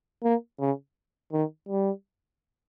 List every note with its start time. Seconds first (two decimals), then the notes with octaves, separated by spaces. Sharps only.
0.24 A#3
0.60 C#3
1.33 D#3
1.69 G3